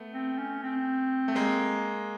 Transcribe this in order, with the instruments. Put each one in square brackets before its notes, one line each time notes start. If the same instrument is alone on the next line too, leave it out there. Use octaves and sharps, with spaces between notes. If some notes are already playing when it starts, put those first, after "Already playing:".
Already playing: [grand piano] A3 B3
[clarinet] C4
C#4
C4
[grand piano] A3
G#3 A#3